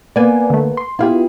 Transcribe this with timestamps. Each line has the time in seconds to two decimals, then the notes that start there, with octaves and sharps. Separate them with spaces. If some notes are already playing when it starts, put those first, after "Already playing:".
0.16 A#3 B3 D5 G#5
0.50 D3 A3
0.77 C6
0.99 B3 E4 F4 G4 G#4